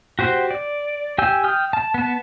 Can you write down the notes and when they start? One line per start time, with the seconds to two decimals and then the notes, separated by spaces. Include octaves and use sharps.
0.19 F#4 G4 C5
0.51 D5
1.18 G4 G5 G#5 E6 G6
1.44 G5 D#6 F6 G6
1.73 A5
1.94 B3 A5